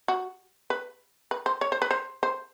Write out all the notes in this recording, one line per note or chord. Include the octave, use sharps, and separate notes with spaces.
F#4
B4
B4
C5
C#5
C5
B4
C5
C5